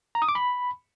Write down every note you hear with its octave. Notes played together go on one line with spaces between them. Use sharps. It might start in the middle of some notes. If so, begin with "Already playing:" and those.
A#5
D#6
D6
B5